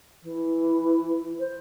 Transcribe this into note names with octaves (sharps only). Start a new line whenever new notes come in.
E3
C5